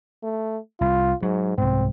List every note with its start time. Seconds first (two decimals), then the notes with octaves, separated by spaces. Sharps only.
0.23 A3
0.81 C2 F4
1.23 G#2 F#3
1.58 C2 G#2 C4